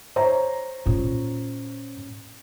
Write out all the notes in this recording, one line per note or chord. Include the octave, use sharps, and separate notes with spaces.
C5 C#5 A#5
A#2 C#4